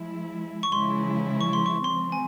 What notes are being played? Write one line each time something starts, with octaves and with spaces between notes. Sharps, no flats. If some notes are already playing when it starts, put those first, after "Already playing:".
Already playing: F3 G#3 E4
C#6
C#3 F3 G#3 E4 C6
C#6
C6
C#6
F3 G#3 C4 C6
G#5